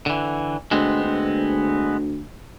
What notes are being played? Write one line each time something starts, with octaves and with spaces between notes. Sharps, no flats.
D3 E3
D2 G#3 B3 C4
D2